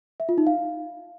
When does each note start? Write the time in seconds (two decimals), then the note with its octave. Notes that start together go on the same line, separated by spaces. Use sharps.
0.20 E5
0.29 F4
0.38 D#4
0.47 F5